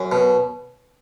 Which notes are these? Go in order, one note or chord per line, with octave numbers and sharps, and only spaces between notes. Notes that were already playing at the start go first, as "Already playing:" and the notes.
Already playing: F#2
B2